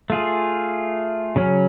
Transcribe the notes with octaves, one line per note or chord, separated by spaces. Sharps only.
A3 F4 G#4
C#3 F#3 C#4